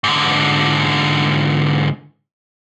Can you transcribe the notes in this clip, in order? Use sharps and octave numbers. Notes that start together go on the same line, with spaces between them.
G#2 D3